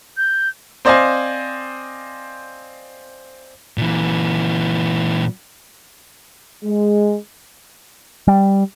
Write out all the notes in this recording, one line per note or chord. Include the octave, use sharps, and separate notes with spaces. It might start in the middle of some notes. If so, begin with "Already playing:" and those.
G6
C4 C5 D5 D#5 F5 G#5
A#2 E3
G#3
G3